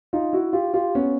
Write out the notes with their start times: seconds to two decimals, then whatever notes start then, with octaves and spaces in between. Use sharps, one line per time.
0.13 D#4 F4
0.33 E4 F#4
0.53 F4 G4
0.74 F4 G4
0.95 B3 C#4